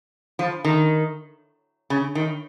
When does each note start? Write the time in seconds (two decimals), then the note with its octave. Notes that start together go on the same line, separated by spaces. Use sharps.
0.39 F3
0.65 D#3
1.90 C#3
2.15 D#3